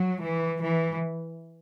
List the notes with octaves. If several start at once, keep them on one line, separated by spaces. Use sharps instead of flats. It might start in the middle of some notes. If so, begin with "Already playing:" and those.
Already playing: F#3
E3
E3